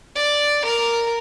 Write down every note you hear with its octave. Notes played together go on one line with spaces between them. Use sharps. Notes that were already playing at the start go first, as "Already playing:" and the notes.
D5
A#4